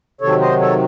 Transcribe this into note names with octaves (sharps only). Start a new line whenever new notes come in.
C3 D#3 F#3 A4 C#5
C5 D#5
A4 C#5